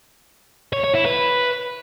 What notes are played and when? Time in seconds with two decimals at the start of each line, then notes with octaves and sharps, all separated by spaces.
0.73 C#5
0.84 C#5
0.95 E4
1.06 B4